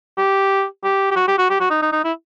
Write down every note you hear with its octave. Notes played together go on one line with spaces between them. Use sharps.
G4
G4
G4
F#4
G4
F#4
G4
F#4
D#4
D#4
D#4
E4